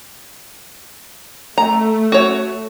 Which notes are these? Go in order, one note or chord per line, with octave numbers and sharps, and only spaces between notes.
A3 A#5
F#4 C#5